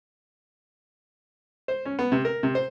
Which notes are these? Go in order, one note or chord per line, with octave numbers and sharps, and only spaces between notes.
C5
C#4
B3
C3
A#4
C3
C5